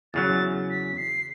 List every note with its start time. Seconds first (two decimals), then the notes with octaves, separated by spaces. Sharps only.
0.14 E2 C#3 F#3 A6
0.70 B6
0.97 C7